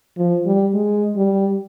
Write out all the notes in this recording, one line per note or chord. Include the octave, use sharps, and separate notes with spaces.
F3
G3
G#3
G3